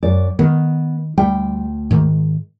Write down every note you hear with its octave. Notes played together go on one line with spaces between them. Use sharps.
F#2 D5
D#3 B3
D2 G3 G5
G#2 D#3